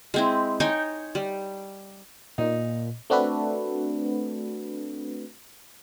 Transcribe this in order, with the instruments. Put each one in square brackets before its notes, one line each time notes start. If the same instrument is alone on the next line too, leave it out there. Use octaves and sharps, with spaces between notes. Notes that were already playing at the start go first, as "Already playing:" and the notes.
[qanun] G#3 C4 E4
D#4 C#5 G5 G#5
G3
[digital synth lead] A#2 [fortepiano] D#4
[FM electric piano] A3 C4 D4 F#4 A4 B4